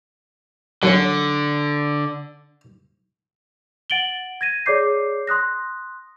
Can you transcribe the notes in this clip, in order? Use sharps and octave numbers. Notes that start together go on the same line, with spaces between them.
F#2 D3 C#4
F#5 A6 D7 F#7 G7
G#6 A#6 D#7
G#4 C#5 D5 D6 G6 C7
C6 D#6 F#6 A#6